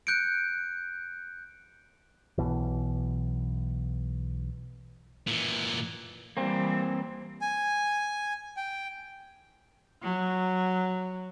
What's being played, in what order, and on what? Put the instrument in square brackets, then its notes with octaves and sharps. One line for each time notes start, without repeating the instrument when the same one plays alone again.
[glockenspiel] F#6 G6 C#7 D7
[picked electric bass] B1 B2 E3
[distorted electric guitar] A#2 E3
[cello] E3 G3 [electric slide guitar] A#3 C4
[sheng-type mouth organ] G#5
G5
[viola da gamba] F#3